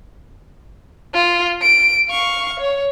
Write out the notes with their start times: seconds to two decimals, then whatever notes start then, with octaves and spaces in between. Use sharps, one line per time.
1.14 F4
1.62 D7
2.09 F5 C#6
2.60 C#5